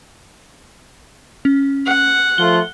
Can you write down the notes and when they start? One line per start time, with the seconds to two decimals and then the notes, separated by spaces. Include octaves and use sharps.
1.45 C#4
1.86 F#5
2.38 F3 A3 F4 G7